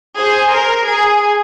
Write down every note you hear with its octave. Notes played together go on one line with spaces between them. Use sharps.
G#4 C5
A#4
G#4